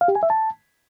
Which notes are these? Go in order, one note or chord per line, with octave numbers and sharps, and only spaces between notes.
F5
G4
G#5
E5
A5